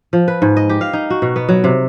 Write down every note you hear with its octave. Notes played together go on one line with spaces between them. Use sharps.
F3
B4
G#2
D#5
G4
F5
D#4
F#4
B2
B3
F#3
C3